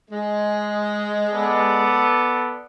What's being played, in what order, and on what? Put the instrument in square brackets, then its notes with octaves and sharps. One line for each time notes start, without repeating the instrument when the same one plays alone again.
[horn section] G#3
[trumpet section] B3 A4 D5